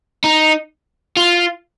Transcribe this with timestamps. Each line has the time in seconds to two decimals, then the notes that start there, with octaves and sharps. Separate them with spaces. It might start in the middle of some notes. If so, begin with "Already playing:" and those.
0.24 D#4
1.17 F4